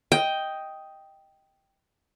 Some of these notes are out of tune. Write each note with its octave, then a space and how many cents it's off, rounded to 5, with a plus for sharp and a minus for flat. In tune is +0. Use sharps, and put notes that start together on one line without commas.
D#5 +10 G5 +0